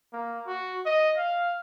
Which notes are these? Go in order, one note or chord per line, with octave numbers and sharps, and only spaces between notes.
A#3
F#4
D#5
F5